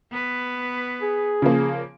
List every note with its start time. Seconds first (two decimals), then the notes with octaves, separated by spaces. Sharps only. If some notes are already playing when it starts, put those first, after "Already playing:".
0.11 B3 B4
1.02 G#4
1.42 C#3 F3 A#3